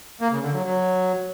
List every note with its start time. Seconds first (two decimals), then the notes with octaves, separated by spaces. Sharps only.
0.21 A#3
0.32 C#3
0.42 D3
0.53 F#3
0.64 F#3